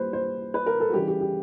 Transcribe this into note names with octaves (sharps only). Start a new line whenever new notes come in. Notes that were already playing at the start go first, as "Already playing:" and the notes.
Already playing: A#2 G3 B4 C5
C5
B4
A#4
A4
F#4
C#3 E3 G3 G4
G4
G4